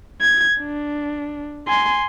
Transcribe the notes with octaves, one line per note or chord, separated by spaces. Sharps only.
G#6
D4
G#5 C6